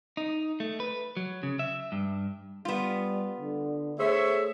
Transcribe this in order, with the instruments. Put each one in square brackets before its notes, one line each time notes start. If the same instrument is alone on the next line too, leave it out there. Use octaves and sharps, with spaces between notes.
[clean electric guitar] D#4
A3
B4
F#3
C#3
E5
G2
[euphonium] G3 [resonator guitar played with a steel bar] B3 F4
[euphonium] D3
[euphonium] A3 [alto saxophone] G#4 [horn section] C5 C#5 E5